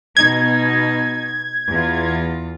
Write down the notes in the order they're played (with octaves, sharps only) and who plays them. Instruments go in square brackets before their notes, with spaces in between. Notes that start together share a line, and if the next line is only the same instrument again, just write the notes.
[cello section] B2 D#4 [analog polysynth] G#6
[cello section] E2 F4